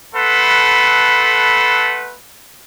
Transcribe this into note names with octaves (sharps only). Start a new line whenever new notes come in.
A3 A4 B4 F#5 B5 C6